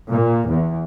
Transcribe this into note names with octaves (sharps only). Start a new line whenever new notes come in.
A#2
E2